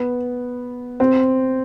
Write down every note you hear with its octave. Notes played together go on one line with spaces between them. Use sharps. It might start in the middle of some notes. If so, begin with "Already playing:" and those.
Already playing: B3
C4